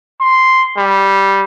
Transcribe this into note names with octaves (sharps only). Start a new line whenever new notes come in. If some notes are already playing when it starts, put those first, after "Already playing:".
C6
G3